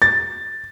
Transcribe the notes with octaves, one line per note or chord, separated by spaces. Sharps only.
A6